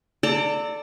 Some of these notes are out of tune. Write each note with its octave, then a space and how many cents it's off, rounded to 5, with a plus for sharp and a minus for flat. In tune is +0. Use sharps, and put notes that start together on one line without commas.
A4 -10 D5 +0 A#5 -45